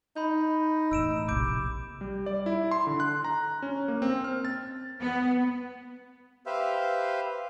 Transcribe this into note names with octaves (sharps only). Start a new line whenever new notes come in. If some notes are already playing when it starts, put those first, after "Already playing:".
D#4 B5 G6
E1 A2 E6 D7 E7
A#1 C3 D6 G6 D7
G3
D5
E4
C6
D3
F#6
A#5
C#4
A#3
C4
F6
A6
B3
G4 B4 C5 E5 F5